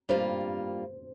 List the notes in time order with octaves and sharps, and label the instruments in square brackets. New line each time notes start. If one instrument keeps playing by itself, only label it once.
[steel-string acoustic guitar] G2 G3 A#3 F4 [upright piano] C5